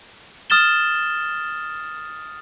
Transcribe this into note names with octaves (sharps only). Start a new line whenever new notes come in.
D#6 F6 A6 E7 G7